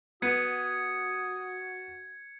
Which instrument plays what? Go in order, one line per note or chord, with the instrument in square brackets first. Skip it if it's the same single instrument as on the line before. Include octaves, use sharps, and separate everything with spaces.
[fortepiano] B3 [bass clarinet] F#4 [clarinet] D#6 [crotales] G#6 C#7